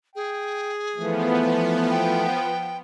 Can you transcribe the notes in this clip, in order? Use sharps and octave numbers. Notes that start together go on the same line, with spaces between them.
G#4 G5
E3 F3 A3 B3
G5